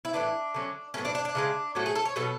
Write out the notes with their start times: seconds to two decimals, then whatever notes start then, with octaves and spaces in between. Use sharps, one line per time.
0.05 E4
0.13 A2 E3 B3 D4
0.54 D3 F#3 C#4
0.94 A2 F#3 B3 C#4
1.05 D4
1.15 D4
1.25 D4
1.35 C#3 E3 G#3
1.75 A2 F#3 A3 C#4 F#4
1.86 G#4
1.95 A4
2.05 C#5
2.16 B2 F#3 B3 A4